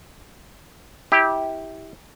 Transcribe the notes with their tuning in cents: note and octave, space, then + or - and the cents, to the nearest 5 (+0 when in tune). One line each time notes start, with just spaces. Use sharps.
E4 -25 G4 +0